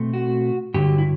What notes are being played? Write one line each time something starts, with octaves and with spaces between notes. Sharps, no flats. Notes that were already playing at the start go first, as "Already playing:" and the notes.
Already playing: B2 A3 C4
F#4
G2 D3 F#3 G4
E4